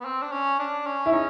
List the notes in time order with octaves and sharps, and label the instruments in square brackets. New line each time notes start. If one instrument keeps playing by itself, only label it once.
[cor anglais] B3
C4
D4
C#4
D4
C#4
[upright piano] E4
[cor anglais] C#4 [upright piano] D#4